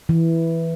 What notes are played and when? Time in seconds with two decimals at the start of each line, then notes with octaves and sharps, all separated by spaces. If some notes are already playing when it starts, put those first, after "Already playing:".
0.09 E3